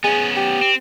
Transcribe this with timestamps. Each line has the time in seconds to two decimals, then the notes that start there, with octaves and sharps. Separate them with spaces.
0.04 B3 C#4 G#4
0.36 G4
0.62 C4